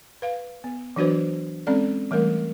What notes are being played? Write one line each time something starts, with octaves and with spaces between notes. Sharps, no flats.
B4 F5
B3
E3 F#3 D4 F#4 B4 C5
G#3 C4 C#4 A4 D5
E3 G3 A3 A#4